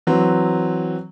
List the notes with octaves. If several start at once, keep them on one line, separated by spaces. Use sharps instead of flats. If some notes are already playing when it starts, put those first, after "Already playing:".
E3 F#3 C4